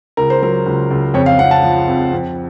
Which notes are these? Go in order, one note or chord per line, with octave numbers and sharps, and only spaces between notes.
C#2 A#4
C5
F#3 A#4
C#2
C#2
F2 C#5
F5
F2 F#5
A5
F3
F2
F2